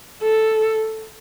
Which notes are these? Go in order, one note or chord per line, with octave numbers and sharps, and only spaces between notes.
A4